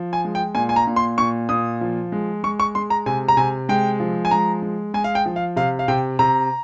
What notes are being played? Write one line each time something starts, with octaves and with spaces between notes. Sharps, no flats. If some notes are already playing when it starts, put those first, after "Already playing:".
Already playing: F3
G#5
G#3
G5
A#2 G#5
G#5
A#5
A#2
C6
A#2 C#6
A#2 D#6
F3
G#3
G#3 C#6
C#6
G#3 C6
A#5
C3 G#5
A#5
C3 G#5
G#3 G5
F3
G#5
G#3 A#5
G#3
G#3 G#5
F5
G5
F3
F5
C3 F5
F5
C3 G5
C3 A#5